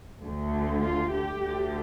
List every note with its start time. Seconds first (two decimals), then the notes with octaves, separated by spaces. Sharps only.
0.23 D2 D3 A3
0.82 F4
1.10 G4
1.40 D2 D3 A3